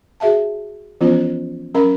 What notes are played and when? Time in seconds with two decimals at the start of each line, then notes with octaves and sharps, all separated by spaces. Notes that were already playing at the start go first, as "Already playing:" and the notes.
0.20 F#4 G#4 E5 F5 A5
1.01 E3 F3 B3 C#4 F4 C5
1.74 F#3 C#4 A#4 F5 B5